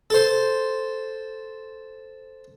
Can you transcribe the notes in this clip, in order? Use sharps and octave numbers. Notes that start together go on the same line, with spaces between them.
A4 C5